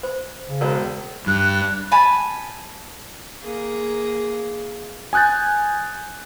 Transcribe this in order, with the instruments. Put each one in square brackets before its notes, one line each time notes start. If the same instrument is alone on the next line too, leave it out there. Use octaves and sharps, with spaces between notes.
[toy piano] C5
[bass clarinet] C#3
[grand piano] E1 [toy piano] A#4 C5
[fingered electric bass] G2 [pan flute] F#6
[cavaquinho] G#5 A5 B5
[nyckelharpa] A#3 G#4
[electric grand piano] G#5 D#6 F#6 G6 A6